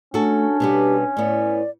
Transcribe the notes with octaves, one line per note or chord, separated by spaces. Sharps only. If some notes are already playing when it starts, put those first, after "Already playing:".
A3 C#4 D4 F#4 A4
B2 G3 B3 G4
A2 B3 D5